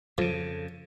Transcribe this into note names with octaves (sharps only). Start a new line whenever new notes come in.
F2 C#3 F3 A4